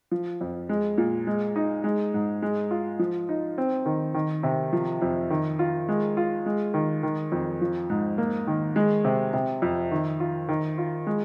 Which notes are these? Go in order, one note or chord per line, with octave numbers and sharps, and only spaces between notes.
F3
F2
G#3
A#2
G#3
D#4
G#3
G#2
G#3
F4
F3
D#4
C4
D#3
D#3
C3
F3
F2
D#3
F4
G#3
F4
G#3
D#3
D#3
F2
F3
G#2
A#3
D#3
G#3
C3
C3
F2
D#3
F4
D#3
F4
G#3